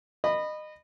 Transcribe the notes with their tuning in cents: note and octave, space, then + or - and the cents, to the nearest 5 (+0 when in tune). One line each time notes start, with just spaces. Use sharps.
D#5 -25 B5 +0